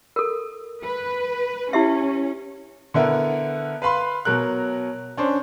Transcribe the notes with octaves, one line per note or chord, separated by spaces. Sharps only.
A4 A#4
B4
C#4 E4 G4 E5
D3 B3 E4 A#4
B4 F5 B5 C6
B2 F#3 A#4 F#6
C#4 D4 C5